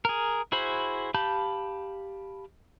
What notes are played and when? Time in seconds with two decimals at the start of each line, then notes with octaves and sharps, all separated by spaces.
0.05 G#4 A#4
0.52 E4 F#4 G#4 C5 B5
1.14 G4 F5 A5 B5 G6